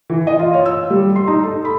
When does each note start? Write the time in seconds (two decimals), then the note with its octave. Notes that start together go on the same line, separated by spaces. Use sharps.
0.10 E3
0.27 D#5
0.39 F4
0.54 C#5
0.66 E6
0.90 G3
1.16 C6
1.28 D#4
1.43 A4
1.65 B5